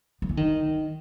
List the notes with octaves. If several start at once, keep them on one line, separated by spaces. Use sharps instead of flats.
F3
E3
D#3